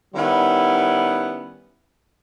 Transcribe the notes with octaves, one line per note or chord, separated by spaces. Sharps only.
D#3 G3 B3 C#4 E4